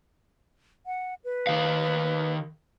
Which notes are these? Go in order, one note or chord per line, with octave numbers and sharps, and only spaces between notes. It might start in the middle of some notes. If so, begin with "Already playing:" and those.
F#5
B4
D#3 F5